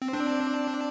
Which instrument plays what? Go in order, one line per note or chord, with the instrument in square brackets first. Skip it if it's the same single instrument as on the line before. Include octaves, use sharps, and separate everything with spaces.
[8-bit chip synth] C4
[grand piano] C4 [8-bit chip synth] D4